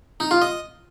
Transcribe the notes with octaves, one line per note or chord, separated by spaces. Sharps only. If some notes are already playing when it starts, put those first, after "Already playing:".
D#4
F4
D#5